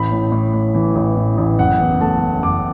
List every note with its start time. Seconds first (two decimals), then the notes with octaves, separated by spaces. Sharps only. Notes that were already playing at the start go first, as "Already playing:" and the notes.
Already playing: A1 B5
0.12 A2
0.32 A2
0.54 A2
0.75 E3
0.95 A1
1.16 A2
1.38 A1
1.59 F#1 F#5
1.80 E2
2.01 A3 A5
2.22 A3
2.43 F#1 D6